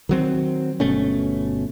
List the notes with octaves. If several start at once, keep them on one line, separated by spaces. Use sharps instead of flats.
D#3 F#3 C4
G1 B2 A3 C#4